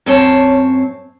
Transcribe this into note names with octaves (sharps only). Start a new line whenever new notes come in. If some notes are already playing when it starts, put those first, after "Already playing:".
F#2 C4 C#5 A5